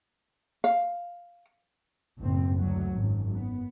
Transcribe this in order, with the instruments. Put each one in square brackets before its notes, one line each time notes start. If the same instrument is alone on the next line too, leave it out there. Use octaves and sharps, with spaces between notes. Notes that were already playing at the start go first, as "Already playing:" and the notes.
[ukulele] F5
[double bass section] F#1 A2 C4
D2 F#3
G#1 F#2
B3